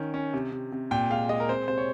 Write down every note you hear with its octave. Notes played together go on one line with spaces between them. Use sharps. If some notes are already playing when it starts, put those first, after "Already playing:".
Already playing: D#3 C#4
C#4
C3
C3
C3
A#2 G5
G#3 F5
G#3 D#5
A#4
C4 C5
C3 C5
C#5